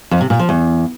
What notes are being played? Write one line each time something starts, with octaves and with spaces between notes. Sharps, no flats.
F2
C3
A#2
F3
E2